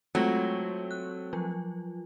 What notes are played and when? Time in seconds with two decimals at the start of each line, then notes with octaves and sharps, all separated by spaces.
0.15 F#3 G#3 A3 C4 F4 A#6
0.91 F#6
1.33 F3 F#3 F4